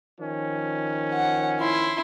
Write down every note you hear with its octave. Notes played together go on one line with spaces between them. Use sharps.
D#3 F3 C#4
F#5
E4 C6